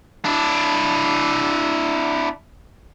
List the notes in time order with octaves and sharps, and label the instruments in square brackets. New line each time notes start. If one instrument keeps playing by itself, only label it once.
[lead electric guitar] D4 E4